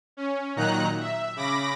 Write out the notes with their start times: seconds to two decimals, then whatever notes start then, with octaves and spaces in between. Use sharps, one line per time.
0.17 C#4
0.56 A#2 D#3 F#3 D#4 A#5 F#6
1.00 E5
1.36 C#3 B5 D6 A#6